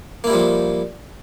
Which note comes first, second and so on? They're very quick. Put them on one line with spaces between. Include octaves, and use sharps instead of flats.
A#3 E4 G3 F3